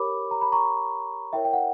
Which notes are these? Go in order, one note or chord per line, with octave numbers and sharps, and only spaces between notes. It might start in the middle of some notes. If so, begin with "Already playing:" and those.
Already playing: G4 A#4 C#5 B5 D6
A#5
B5
A#5 C#6
E4 A#4 C#5 E5 G5
G5
F#5